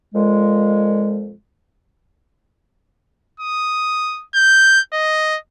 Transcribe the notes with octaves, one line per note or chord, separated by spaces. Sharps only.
F2 A#2 G#3
D#6
G6
D#5